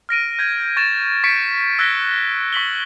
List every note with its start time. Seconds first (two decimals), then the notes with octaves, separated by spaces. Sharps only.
0.09 F6 A#6 D7 D#7
0.39 G6 G#6 A#6
0.77 C#6 G#6 A6 E7
1.24 C#6 B6 C#7 D7
1.79 E6 F#6 G#6 A#6 B6 G7
2.53 C#6 B6 F#7 G7